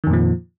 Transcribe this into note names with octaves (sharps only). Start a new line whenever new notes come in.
F2 A#2 D#3 F3